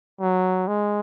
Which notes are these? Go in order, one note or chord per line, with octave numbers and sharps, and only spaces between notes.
F#3
G#3